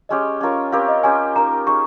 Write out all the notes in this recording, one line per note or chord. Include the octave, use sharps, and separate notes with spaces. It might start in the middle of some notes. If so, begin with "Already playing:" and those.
G#3 C#4 G4 D#5
C#4 F4 A#4 C#5
C4 G4 A#4 C#5 F5
D#5
C#4 G4 C5 G#5
A#3 D#4 A#4 A#5
D#4 G#4 C5 C#6